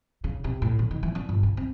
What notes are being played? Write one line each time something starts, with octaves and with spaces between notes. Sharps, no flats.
C#3
C3
A2
D3
D#3
E3
D4
G1
C#3
C4